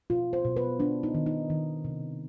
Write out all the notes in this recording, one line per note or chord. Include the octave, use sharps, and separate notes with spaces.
B2 F4
C5
B2
B4
B3 D4
D#4
D#3
D#4
D#3
C3